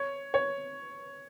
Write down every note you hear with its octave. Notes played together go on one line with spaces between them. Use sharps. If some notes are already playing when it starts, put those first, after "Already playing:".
Already playing: C#5
C#5